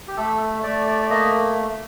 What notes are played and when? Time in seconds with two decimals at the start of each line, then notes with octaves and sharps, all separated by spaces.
0.08 G4
0.17 A3 A4
0.63 A3 D5
0.87 D5
1.02 D5
1.10 A#3 D#5